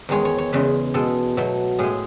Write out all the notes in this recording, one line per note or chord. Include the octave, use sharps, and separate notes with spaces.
E2 D#3 G#3 C#5
C#5
C#5
E2 C#3 G#3 B4
B2 G#3 A4
B2 F#3 A3
A2 G#3 G#4